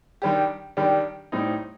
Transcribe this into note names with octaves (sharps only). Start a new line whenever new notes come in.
D#3 G3 D4 G4
D#3 G3 D4 G4
A2 G3 C4 D#4